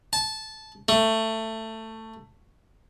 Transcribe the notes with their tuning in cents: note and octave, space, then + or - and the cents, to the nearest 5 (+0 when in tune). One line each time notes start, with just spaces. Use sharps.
A5 -15
A3 +15